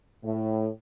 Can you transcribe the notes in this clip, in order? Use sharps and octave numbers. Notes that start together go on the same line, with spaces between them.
A2